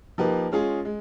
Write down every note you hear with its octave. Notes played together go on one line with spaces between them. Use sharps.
F3 A#3 D#4 G4 B4
G#3 C#4 F4 G#4
G#3